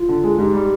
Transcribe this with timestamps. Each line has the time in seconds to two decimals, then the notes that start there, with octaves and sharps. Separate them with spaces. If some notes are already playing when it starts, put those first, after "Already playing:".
Already playing: F4
0.09 D3
0.24 G#3
0.38 G#2 G4
0.53 G3